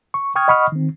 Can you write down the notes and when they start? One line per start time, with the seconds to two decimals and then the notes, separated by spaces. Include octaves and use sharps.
0.14 C#6
0.36 G5 C#6 D#6 F6 G#6
0.48 D#5 F#5 B5 C#6 D#6 F6
0.72 D#3 C4